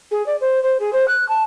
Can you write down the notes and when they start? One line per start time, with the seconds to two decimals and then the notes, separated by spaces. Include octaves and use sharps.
0.11 G#4
0.26 D5
0.40 C5
0.62 C5
0.79 G#4
0.92 C5
1.08 F#6
1.28 A5